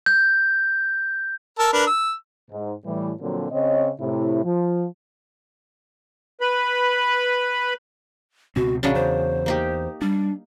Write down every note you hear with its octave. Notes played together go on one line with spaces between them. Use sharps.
G6
A#4 A5 E6
D4 A#4 B4
E6
G#2
A2 E3 G3
A#2 D3 F3 F#3 A#3 C4
C#3 C4 C#5 D#5
A2 C3 E4
F3
B4 B5
C#2 B2 C4 F#4
A#1 C#3 F#3 C#4 D4
E2 C5
A#3 D#4 G4
G3 D4